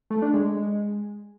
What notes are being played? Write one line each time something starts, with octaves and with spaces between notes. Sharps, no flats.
A3
D4
G#3
G#3
G#3